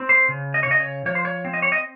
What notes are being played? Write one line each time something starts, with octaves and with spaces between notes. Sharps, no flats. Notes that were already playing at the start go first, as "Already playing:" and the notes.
Already playing: C4
C5
C#3
D#5
C#5
C#3 D#5
C#5
F3 C#5
C5
C#5
C4
D#5
C#5
D#5